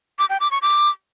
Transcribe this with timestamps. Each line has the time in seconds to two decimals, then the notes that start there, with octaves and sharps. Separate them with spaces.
0.19 D6
0.30 G5
0.40 D6
0.51 C#6
0.62 D6